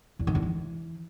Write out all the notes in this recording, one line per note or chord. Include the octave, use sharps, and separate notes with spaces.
E2
D#3
E2
E3